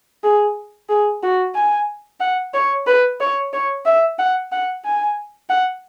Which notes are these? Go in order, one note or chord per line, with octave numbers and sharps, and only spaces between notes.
G#4
G#4
F#4
G#5
F#5
C#5
B4
C#5
C#5
E5
F#5
F#5
G#5
F#5